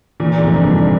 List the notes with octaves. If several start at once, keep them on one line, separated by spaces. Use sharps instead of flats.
A#2 E3
F1 G#2
G2
G3
G#2